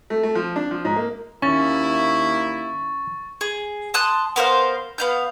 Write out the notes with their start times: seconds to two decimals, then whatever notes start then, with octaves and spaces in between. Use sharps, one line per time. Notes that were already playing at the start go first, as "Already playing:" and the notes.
0.10 A3
0.23 A3
0.35 F3
0.56 D4
0.71 F3
0.85 G#2
0.96 A#3
1.42 D#2 A#3 C#4 E4 C#6 A6
3.41 G#4
3.94 A5 C6 D#6 F#6
4.36 B3 A#4 C5 F5
4.98 B3 F5 G6